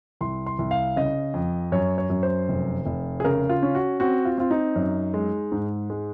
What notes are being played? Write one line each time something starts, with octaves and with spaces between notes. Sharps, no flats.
C2 C6
C6
C2
F5
C#3 D#5
F2
F#2 C#5
C#5
F#2
C5
F1
F1
G#4
C#3 A#4
F4
C#4
F#4
C4 F#4
F4
C4 F4
D#4
F#2
G#3
G#2
G#3